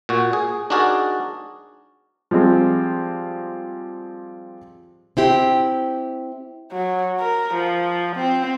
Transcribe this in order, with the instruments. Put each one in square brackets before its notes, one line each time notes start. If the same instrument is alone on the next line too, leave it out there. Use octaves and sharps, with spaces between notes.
[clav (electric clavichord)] A#2 F#4
G#4
D4 D#4 F#4 G#4 A#4 D5
[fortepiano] F3 G3 G#3 C4
[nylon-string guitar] C4 E4 G4
[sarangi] F#3
A#4
F3
C4